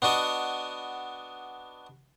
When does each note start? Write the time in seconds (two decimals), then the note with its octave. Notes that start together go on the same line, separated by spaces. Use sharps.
0.02 B3 D4 F#4 D#5